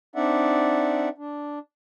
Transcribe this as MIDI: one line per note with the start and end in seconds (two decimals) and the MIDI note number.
0.16 1.09 60
0.16 1.09 62
0.16 1.09 63
0.16 1.09 74
0.16 1.09 76
0.16 1.09 78
1.18 1.59 62